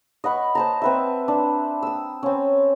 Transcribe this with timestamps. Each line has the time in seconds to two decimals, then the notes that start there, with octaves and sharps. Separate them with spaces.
0.24 D#5 F#5 B5 C#6
0.55 C5 A5 A#5
0.82 C4 B4 E5
1.28 D4
1.83 D#6 E6
2.23 C4 C#4